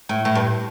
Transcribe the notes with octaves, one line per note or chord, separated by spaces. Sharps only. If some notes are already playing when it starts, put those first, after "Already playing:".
A2
A2
G2